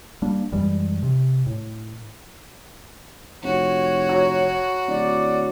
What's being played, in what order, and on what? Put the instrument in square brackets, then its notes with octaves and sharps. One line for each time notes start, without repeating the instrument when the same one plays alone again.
[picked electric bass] G3 A#3 D4
F#2 E3 G3 G#3
C3
A2
[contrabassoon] F1 [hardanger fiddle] F#4 [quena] C#5
[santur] F#3
[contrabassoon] D1 [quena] D5